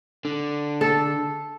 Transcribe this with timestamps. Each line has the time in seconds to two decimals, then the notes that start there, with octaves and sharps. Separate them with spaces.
0.25 D3
0.81 A4